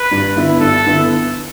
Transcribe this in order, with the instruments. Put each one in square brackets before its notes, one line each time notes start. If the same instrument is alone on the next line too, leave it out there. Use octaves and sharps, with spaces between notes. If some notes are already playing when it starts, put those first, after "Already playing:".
Already playing: [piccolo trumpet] B4
[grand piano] G2
D3 B3 E4
[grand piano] G2 [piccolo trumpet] A4
[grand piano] D3 B3 E4